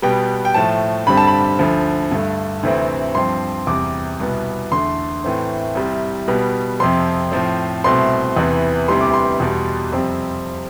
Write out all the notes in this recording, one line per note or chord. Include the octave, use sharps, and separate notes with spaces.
B2 G3 B3 G5
G5
A2 F3 A3 A5
G2 D3 G3 C4 B5
A5
B5
D2 D3 F3
G2 D3 A3
D2 C3 E3 A3 C4
G2 F3 C4 C6
E2 C3 G3 D6
C2 B2 B3
E2 D3 A3 C6
A2 E3 A3 C4
C2 C3 G3
B2 G3 B3
F2 C3 F3 C6
A2 F3 C4
C2 B2 A3 C4 C6
E2 C3 E3 B3
D2 C3 E3 G3 B3 C6
D6
C6
E2 B2 G3
F2 C3 G3 C4